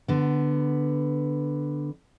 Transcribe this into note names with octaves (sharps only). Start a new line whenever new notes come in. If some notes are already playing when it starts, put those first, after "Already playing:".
D3 B3